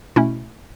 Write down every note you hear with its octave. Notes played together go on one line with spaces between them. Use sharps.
B2 A3 C#4 E4